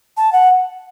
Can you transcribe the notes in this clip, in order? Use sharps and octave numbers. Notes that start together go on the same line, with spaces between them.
A5
F#5